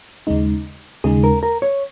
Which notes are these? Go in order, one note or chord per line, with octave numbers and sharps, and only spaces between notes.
D#2 C#3 G#3 D#4
D#2 C#3 G#3 D#4 G#4
A#4
A#4
C#5